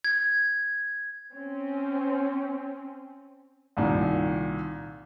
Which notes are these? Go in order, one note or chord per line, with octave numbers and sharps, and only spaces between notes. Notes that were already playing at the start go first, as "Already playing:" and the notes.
G#6
C4 C#4
C2 A#2 D#3